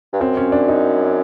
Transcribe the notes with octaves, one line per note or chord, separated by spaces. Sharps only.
G2
F#2 C4
C#4
D4
D#4